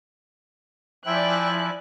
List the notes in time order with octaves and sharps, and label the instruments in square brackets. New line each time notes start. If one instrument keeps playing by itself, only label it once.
[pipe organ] F3 E4 [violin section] D5 G#5 F#6 [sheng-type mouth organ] E5 G5